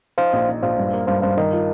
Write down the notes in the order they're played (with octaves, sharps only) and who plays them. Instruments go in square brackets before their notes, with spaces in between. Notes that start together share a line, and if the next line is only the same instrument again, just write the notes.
[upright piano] D#4 [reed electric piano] C5 F5
[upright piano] A#1
D#4
[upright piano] A#1 [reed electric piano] C5 F5
[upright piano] G2
A#3
[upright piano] G2 [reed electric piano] C5 F5
[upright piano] G2 [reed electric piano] C5 F5
[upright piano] D#3 [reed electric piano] A#4 D#5
[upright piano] F4